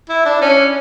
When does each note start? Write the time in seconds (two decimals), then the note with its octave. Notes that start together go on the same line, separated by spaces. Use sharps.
0.09 E4
0.25 D4
0.41 C#4